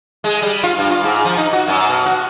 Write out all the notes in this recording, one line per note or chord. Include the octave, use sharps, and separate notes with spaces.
G#3
G3
F4
G2
F4
G#2
F3
D#4
F#4
F#2
B2
F#4